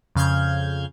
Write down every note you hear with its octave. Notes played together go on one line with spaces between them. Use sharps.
F2 C#3 F5 F6 G6 G#6